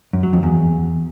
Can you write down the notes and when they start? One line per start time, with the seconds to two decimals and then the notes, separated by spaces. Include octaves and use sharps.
0.13 F#2
0.23 F#3
0.33 F2
0.43 E2